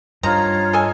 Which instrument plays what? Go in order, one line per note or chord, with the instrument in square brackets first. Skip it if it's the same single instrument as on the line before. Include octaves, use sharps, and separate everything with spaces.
[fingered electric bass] G2 [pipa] D#3 F3 A#3 [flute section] F4 C#5 [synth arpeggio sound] A#5
[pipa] A4 D#5 G#5